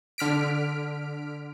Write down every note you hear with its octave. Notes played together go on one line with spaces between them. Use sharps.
D3 F6 B6 D7